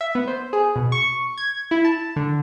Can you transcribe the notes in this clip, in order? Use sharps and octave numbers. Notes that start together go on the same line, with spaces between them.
E5
B3
C5
G#4
B2
C#6
G#6
E4
A5
D3